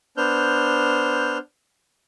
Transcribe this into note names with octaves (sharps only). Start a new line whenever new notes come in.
B3 D4 C5 F6 G6